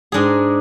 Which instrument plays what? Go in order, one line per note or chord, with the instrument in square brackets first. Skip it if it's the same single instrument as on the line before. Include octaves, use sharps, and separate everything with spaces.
[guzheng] G#2 G#3 D4 G#4